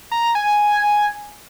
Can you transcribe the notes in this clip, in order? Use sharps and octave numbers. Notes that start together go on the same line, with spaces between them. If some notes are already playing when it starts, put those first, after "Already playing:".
A#5
G#5